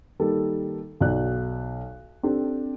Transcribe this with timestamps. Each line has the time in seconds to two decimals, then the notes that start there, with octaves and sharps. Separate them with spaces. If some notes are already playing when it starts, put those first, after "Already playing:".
0.20 D#3 G3 A#3 A4
1.01 B1 F#4 D5 F#6
2.23 C4 D4 G4 A4